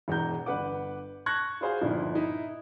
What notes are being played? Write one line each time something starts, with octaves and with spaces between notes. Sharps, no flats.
E1 E2 A#5 G6
G1 B4 F#5 D6
A5 C#6 F#6 G#6 A#6
F4 F#4 G#4 C5 F5 G#5
G1 A#2 F3 D#4 E4
D#4 E4 E5